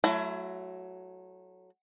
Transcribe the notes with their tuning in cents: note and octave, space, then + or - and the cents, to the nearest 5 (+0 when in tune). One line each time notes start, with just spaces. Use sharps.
F#3 +0 A3 -20 E4 +30